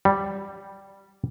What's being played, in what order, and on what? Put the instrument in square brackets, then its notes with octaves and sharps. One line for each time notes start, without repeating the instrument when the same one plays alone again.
[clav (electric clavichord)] G3